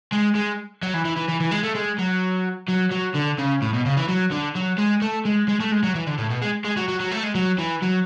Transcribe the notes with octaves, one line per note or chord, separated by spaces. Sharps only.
G#3
G#3
F#3
E3
E3
E3
E3
E3
G#3
A3
G#3
F#3
F#3
F#3
D3
C#3
A2
B2
C#3
E3
F#3
D3
F#3
G#3
A3
G#3
G#3
A3
G#3
F#3
E3
D3
A2
B2
G#3
G#3
F#3
F#3
F#3
A3
G#3
F#3
E3
F#3